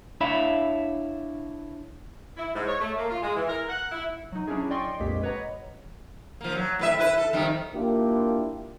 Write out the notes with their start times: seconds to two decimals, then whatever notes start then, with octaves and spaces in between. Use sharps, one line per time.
0.21 D4 E4 C#5 E5 F5 B5
2.38 E4
2.54 G#2
2.67 C#5
2.81 A3
2.97 A#3
3.10 F4
3.22 G#3
3.36 E3
3.48 A#4
3.68 F#5
3.91 E4
4.32 F#3 D#4
4.47 F#3 C#4 D4 E4 G#4
4.70 D5 D#5 G5 C6 C#6
5.00 A#1 F2 A#2 G#3 G4 B6
5.23 B4 C#5 D#5 F#5 A#5
6.41 F3 A#3
6.55 F#3
6.79 A2 B4 E5
6.98 E4 B4
7.18 A4
7.33 F2 D#3 G3
7.74 A#3 D4 E4 F4 G4